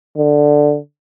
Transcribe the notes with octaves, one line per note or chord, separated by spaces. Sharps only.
D3